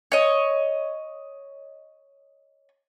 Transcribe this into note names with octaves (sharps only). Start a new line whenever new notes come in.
C#5 D#5